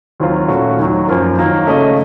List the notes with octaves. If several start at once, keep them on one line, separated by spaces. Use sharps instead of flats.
D#2 D#3 F#3 C4 F4
A#2 A3 C#4 F#4
D#2 D#3 F#3
F#2 F3 A#3 F4 A#4
D#3 F#3 A#3 D#4
C#3 A3 C#4 A4 D#5